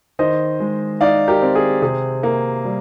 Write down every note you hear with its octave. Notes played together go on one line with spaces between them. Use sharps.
D#3 C5 D#5
G#3
D#4 D5 F5
G4 A#4
C4
G#4
C3 G#4
A#3
G3